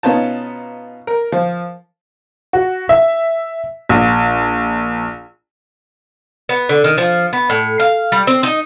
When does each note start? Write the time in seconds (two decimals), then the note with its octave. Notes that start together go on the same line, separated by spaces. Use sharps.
0.03 B2 B3 C#4 D#4 F4 A5
1.07 A#4
1.32 F3
2.53 F#4
2.89 E5
3.89 A#1
6.49 B3
6.69 D3
6.84 D#3
6.98 F3
7.33 B3
7.50 A2
7.80 F5
8.12 G3
8.27 C4
8.43 D#4